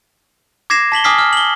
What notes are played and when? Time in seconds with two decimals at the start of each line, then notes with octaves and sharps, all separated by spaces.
0.70 D6 G#6 A#6 C7 E7
0.92 A5 B6 F#7 G7
1.04 G#5 D6 D#6 F6 B6 C7
1.18 F6
1.33 F#7 G7